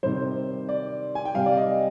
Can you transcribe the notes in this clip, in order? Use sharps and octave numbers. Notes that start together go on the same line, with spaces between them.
C3 D#3 G3 C5
D5
G#5
G5
C3 G3 F5
D5
D#5